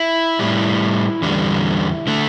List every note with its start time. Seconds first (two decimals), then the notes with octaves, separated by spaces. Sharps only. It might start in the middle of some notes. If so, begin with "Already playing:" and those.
Already playing: E4
0.39 A2 G3
1.22 E2 D3 G3
2.07 D3 A3